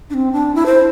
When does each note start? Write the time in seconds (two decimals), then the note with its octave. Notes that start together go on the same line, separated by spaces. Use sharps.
0.10 D4
0.14 C4
0.33 D4
0.55 E4
0.66 C5